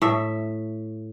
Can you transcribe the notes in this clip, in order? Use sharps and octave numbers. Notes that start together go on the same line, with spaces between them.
A2 E5